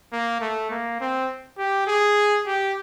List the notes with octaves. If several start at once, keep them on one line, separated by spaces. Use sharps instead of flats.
A#3
A3
A#3
C4
G4
G#4
G4